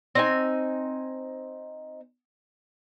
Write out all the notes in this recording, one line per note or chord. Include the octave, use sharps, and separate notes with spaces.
C4 D#4 G#5